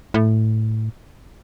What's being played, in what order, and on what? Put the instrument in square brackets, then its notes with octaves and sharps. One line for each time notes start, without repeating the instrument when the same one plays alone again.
[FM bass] A2